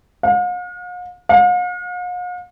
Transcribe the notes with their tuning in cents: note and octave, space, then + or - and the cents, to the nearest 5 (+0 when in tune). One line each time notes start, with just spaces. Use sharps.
F5 +45
F5 +45